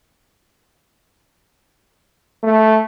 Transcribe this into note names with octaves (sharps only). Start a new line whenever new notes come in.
A3